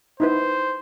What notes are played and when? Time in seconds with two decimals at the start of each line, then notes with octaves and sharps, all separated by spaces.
0.20 D#4 E4 B4 C5